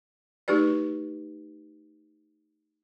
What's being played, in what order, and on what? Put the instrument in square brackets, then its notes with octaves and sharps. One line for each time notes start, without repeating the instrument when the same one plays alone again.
[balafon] A3 D#4 F#4 G4 B4 D5